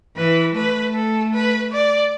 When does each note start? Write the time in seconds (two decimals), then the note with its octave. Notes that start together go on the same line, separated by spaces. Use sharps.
0.17 E3 B4
0.55 A3 B4
0.95 A4
1.33 B4
1.72 D5